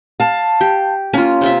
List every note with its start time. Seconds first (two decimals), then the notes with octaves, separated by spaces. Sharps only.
0.20 F5 A5
0.61 G4
1.13 A#3 C#4 F4
1.41 C3 F4 E5